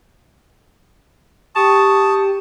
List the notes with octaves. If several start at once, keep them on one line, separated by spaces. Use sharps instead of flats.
G4 A5 C#6 D#6